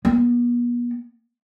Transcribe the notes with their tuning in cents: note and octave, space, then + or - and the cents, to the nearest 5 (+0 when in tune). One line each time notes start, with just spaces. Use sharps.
B3 -40